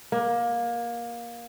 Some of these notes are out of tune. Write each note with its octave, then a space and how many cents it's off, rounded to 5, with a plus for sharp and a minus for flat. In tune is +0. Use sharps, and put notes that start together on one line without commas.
A#3 +20